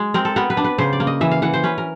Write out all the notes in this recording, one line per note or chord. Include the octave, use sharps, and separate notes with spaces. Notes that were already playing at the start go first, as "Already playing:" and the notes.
Already playing: G#3
C4 A#4
A4
B3 A#4
B4
D4
B4
C#3 C5
D5
A#3
D#5
E3 E5
F5
E3 F#5
C5
C#4 B4
A#4